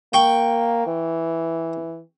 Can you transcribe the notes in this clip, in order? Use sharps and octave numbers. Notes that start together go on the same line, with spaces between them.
A#3 G5 C#6
E3